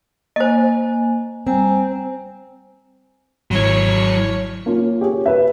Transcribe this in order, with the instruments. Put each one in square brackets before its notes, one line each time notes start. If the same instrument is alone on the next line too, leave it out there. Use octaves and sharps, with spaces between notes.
[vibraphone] A#3 G#5 [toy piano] C5 D#5
[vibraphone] G3 G#5 A#5 [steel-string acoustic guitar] C4
[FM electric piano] G#1 G#6 [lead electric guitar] F#3 E4 [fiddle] C#5
[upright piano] A#3 C#4 F4
G4 G#4 C#5
B4 E5